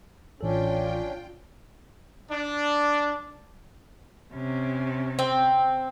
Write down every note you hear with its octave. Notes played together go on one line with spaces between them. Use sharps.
A1 C#4 D4 F4 A4 G5
D4
C3 C#4
C4